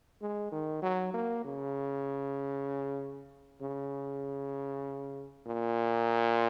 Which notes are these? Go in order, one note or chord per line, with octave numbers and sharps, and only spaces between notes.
G#3
D#3
F#3
A#3
C#3
C#3
A#2